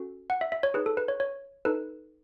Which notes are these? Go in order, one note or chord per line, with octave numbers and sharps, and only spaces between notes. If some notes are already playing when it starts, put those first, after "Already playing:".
Already playing: C#4 F#4 A4
F#5
E5
E5
C#5
D#4 G#4 B4
A4
B4
C#5
C#5
D#4 A4 B4